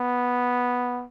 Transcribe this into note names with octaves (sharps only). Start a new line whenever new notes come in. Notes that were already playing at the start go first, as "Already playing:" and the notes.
Already playing: B3